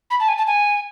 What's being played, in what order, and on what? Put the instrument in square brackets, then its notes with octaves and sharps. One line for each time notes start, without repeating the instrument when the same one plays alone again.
[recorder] B5
A5
G#5
A5
G#5